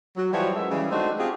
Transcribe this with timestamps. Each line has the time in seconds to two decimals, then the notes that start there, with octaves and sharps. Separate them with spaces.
0.17 F#3
0.33 E3 F3 G3 F#4 C#5
0.56 F#2 G#3 E5
0.70 C#3 E3 G3
0.91 G#3 A3 C4 D4 D#4 F#4
1.17 C4 F4 G4 G#4